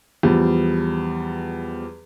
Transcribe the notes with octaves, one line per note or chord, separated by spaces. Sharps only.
E2 F3 G3